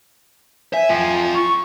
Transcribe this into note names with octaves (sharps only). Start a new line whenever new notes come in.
E5 G#5
F4 G5
C#6